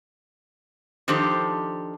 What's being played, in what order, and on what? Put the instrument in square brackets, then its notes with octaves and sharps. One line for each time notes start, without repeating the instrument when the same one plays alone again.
[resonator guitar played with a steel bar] D#3 F3 D4 G4 A4 C5